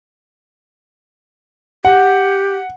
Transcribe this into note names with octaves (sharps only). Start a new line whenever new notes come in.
G4 F#5